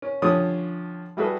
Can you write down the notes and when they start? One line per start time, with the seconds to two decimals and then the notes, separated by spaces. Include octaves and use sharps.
0.02 C#4
0.22 D3 F3 C#4 G4 C#5 D#6
1.17 G3 E4 F#4 G#4 A4 B4